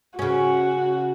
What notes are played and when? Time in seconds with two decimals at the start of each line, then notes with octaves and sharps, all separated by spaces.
0.19 C#3 C#4 F#4